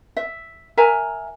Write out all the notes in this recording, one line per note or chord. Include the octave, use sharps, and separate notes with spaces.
E5
A#4 E5 G#5 A#5